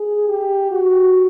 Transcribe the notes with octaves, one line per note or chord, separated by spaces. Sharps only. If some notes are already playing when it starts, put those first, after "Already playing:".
Already playing: G#4
G4
F#4